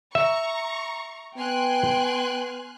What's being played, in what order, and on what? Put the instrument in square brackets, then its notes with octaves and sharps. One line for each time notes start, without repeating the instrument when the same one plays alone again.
[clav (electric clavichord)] E5 [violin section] A#5 C#6
[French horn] B3 [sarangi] G5 [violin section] G#5 C6 F#6